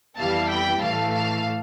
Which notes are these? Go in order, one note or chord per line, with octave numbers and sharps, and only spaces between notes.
F2 E3 G3 B3 E4 F5 A5
G5 B5
A2 E3 A3 F5 A5
F5 A5